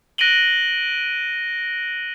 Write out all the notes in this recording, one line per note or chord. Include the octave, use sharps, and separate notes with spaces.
F#6 A#6 D7 D#7 F#7 G7